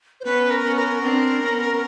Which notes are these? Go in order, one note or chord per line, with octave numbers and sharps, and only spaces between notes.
C5
B3 C#4 B4
A#4
B3 C#4
A#4
C4 D4
B3 C#4